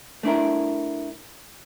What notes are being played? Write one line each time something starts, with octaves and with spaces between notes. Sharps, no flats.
A3 D4 E4 A#4